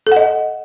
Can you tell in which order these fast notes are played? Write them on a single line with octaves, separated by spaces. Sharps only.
A4 F#5 D#5